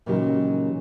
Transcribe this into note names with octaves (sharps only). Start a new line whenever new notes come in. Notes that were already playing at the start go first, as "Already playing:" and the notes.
A#2 C#3 E3 F#3 D#4 G4